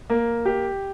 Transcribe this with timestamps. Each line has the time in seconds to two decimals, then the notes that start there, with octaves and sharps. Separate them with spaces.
0.10 A#3
0.45 G4